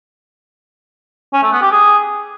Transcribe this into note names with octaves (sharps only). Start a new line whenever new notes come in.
C#4
A3
B3
G4
G#4